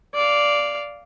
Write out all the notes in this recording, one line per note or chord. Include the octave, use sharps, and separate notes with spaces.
D5 F5